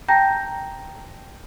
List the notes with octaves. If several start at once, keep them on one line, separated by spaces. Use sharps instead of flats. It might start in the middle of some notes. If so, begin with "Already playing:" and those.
G5 A5 A#5 G6 A#6